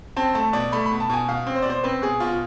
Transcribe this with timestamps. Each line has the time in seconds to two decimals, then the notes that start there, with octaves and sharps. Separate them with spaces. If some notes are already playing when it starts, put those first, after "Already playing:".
0.16 C4 A5
0.35 A3 A5
0.53 B2 D5
0.72 A3 B5
0.86 B5
0.91 B2
1.00 A5
1.10 B2 G#5
1.28 B2 F5
1.46 C4
1.55 C5
1.62 D5
1.66 B2 C5
1.84 C4 B4
2.02 B2 G#4
2.20 B2 F4